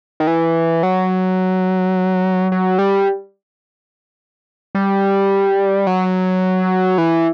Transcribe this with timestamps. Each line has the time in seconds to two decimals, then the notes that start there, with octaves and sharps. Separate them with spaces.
0.20 D#3
0.27 E3
0.83 F#3
2.52 F#3
2.79 G3
4.75 G3
5.87 F#3
6.98 E3